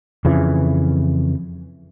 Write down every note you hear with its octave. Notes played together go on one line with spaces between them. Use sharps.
F2 C#3 E3